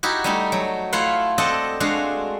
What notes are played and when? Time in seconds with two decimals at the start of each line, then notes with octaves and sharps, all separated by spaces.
0.03 D#4 E4 F#4 G4
0.24 G3 A3 D#4
0.52 F#3
0.93 A3 E4 F4 F5 F#5
1.38 C4 A4 D5 D#5 F#5 A5
1.80 G#3 A3 D4 F#4 F5